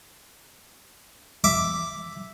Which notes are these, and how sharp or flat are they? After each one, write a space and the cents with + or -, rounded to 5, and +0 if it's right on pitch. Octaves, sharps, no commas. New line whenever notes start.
E5 +0 D6 +0